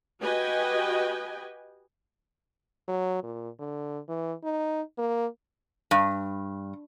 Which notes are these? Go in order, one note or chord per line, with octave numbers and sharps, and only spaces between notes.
F#4 G4 B4 D#5 G5 G#5
F#3
A#2
D3
E3
D#4
A#3
G2